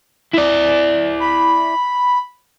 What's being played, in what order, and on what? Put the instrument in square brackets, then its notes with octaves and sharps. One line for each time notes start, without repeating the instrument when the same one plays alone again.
[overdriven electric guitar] E4 D5
[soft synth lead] B5